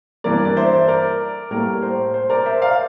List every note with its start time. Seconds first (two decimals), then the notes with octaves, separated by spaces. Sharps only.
0.24 G2 E3 A#3 A#4 D5
0.45 D5
0.56 C5 E5
0.88 A#4 D5
1.51 A2 G3 A#3 A#4
1.82 C5
2.14 C5
2.30 A#4 D5
2.46 C5 E5
2.62 D5 F5